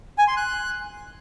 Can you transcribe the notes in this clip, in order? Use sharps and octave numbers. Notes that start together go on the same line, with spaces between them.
G#5
C6
F#6